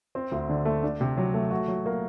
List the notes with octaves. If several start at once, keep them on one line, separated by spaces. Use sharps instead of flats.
C4
D2
D3
A3
D4
C3
F#3
A3
F#4
F#3
A#3